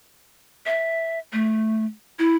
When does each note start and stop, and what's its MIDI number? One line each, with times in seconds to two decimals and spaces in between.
0.66 1.19 76
1.33 1.85 57
2.19 2.36 64